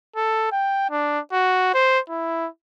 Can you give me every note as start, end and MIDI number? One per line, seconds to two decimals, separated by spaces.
0.16 0.49 69
0.52 0.89 79
0.90 1.20 62
1.32 1.72 66
1.74 1.99 72
2.09 2.47 64